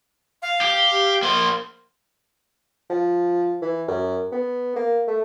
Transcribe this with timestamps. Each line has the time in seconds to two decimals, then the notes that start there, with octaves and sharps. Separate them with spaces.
0.42 F5
0.61 G4
1.23 A#3 C5
2.90 F3
3.62 E3
3.88 F#2
4.32 B3
4.76 A#3
5.07 A3